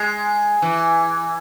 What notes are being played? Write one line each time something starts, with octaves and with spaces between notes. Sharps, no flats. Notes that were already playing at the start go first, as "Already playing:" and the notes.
Already playing: G#3
E3